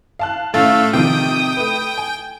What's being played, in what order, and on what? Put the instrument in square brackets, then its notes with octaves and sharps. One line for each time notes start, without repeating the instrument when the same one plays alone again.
[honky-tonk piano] F5 A5 F#6
[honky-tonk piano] A2 C#4 A6 [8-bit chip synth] A3 [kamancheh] F5 E6
[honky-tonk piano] C3 D#3 F3 [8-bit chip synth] G5 [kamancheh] D#6
[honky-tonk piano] A3 B4
G#5